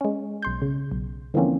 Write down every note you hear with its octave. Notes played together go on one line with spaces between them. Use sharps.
G#3 C#4
B1 C6 G6
C#3
B1
D3 E3 F3 A#3 C4 C#4